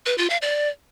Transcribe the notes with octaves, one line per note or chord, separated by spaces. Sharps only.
B4
F4
F5
D5